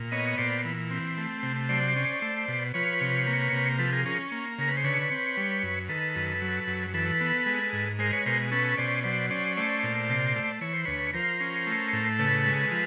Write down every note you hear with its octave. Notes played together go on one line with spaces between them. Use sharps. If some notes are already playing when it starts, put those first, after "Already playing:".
Already playing: A#2
B3 C#5 D#5
A#2 C5 D5
E3
C4
A3
C3
F#3 C5 D5
C#4
A3
B2
F3 B4 C#5
C3
A#3
C3
F3 A4 B4
G#4 A#4
C#4 G#4 A#4
A#3
C#3 A#4
B4
C5
D3 B4 C#5
C4
G3
F#2
D#3 A4 B4
F#2
F#3
F#2
E3 A4 B4
B3
G#3
G#2
G#3 A#4 C5
B4 C#5
B2 A#4 C5
C#4 A4 B4
B2 C5 D5
F#3 C5 D5
C#4 C5 D5
A3 C5 D5
A#2
C3
A3
E3 C#5
C5
D2 B4 C#5
F3 A#4 C5
C#4
A3
A2
C#3 A4 B4
G#3
F3